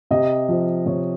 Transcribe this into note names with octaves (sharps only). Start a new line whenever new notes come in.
C3 D#5
F3
C3 C#5